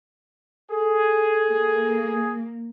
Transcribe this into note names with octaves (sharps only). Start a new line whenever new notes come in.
G#4 A4
A#3